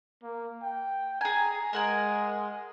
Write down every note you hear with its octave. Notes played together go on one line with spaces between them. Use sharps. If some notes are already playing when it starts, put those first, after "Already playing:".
A#3
G5
G#4 G#5 A#5
G#3 A#4 F#5 G#5